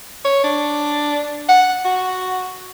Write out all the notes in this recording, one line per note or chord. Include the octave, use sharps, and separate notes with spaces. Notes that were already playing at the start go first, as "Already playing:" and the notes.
C#5
D4
F#5
F#4